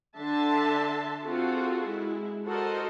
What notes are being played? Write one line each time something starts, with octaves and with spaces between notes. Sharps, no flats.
D3 D4 E5 A5 C6
C4 F4 F#4 G#4 A4
G#3 E4
F#4 A4 A#4 C5 D#5